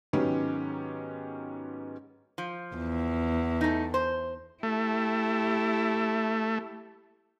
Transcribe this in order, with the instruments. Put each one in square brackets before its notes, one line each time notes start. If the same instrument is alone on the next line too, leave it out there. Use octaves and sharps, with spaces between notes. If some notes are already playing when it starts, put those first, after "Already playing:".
[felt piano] G#2 D#3 F#3 B3 C#4 G4
[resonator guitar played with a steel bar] F3
[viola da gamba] E2
[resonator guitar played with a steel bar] A3 D#4
C5
[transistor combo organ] A3 [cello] E4 G4